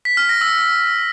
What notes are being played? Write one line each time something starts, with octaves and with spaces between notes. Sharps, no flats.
B6
F6
A#6
E6